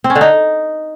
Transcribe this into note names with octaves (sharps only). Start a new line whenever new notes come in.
C4
C#4
D3
D#4